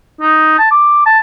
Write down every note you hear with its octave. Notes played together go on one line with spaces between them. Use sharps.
D#4
A5
D6
A5